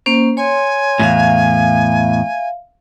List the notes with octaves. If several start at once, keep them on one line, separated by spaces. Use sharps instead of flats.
A#3 C#4 C5
C#5 G#5 C6
E2 A2 E5 F5